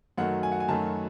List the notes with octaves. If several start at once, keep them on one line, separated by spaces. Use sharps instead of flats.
F#2 D#3 F#3 A3 F#5
G#5
F#5
G#5
F#2 D#3 F#3 A3 A5